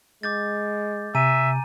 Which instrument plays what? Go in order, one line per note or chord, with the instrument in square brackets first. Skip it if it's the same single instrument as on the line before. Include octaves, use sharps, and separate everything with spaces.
[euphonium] G#3 [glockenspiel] D6 G6 A6
[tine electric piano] C3 [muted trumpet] E5 [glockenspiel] G#5 A#5 D#7